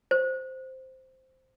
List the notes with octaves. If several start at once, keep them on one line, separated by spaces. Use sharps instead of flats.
C5